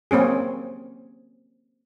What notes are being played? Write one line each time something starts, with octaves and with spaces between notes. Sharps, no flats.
A#3 C4 C#4 G#4